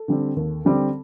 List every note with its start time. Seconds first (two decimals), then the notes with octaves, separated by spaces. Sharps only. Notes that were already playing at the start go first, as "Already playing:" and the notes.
Already playing: A4
0.08 D3 G3 C4
0.36 D#2
0.65 D3 G3 C4